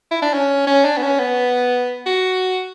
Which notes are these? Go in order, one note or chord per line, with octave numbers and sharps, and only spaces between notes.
E4
D4
C#4
C#4
D4
B3
C#4
B3
F#4